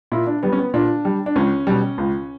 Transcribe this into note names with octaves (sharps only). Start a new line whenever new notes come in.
A#2 E4
D4
G3 B3
C#4
B3
A#2 D4
G3
D4
C#2 C#4
B2 G3
C#2